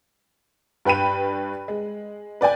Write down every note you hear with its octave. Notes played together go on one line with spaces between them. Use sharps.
G2 B4 G5 B5 D#7
G#3
B4 D5 G5 G#5